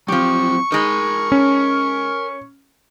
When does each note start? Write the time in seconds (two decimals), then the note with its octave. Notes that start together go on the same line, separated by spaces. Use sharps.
0.08 F3 F#3 C4 G4 C#6
0.72 G#3 D#4 A#4 B5
1.32 C#4